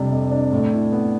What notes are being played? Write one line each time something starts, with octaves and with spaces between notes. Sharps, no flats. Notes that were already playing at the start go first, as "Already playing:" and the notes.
Already playing: F2 C3 G3 D4
F2
D4
A2
E4
B3